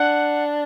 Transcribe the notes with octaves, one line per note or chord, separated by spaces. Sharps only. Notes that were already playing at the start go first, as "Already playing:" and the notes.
Already playing: D4 F#5